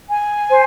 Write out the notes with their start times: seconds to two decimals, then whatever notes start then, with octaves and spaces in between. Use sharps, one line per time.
0.10 G#5
0.50 C5